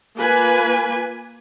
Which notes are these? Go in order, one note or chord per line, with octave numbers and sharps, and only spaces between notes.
A#3 F4 B4 G#5